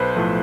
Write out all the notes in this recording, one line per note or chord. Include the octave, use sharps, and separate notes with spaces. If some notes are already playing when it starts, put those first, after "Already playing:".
Already playing: B1 B4 C5
A2 F3 A3